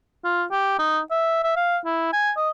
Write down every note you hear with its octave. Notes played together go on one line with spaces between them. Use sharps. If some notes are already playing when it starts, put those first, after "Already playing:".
F4
G4
D#4
E5
E5
F5
E4
G#5
D#5